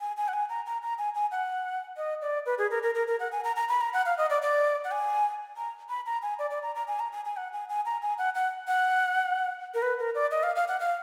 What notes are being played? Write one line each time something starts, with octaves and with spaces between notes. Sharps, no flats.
G#5
G#5
F#5
G#5
A#5
A#5
A#5
G#5
G#5
F#5
D#5
D5
B4
G#4
A#4
A#4
A#4
A#4
F#5
G#5
A#5
A#5
B5
A#5
F#5
F5
D#5
D5
D5
F#5
G#5
A#5
B5
A#5
G#5
D5
D5
A#5
A#5
G#5
A#5
G#5
G#5
F#5
G#5
G#5
A#5
G#5
F#5
F#5
F#5
A#4
B4
A#4
D5
D#5
F5
F5
F#5
F5